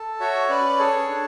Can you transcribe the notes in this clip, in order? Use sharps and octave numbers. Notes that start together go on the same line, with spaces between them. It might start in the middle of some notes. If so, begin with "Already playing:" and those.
Already playing: A4
F#4 C#5 E5
C#4 B4 D5
G#4 A4 C#5
D4